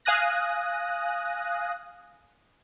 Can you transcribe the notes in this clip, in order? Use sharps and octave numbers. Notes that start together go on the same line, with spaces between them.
F5 G#5 D#6 F#6 A#6